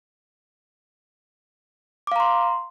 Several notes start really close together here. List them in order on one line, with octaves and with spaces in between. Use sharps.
D6 F5 A#5 C6